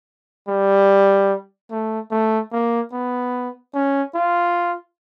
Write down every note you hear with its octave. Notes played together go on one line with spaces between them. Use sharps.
G3
A3
A3
A#3
B3
C#4
F4